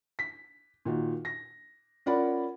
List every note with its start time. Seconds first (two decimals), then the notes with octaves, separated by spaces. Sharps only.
0.19 B6
0.85 A#2 D#3 F#4
1.25 A#6
2.06 C#4 F4 A#4 D5 F#5 B5